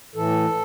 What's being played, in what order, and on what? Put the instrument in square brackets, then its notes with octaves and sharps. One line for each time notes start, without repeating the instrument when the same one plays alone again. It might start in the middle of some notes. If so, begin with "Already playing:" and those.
[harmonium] A2 E3 A4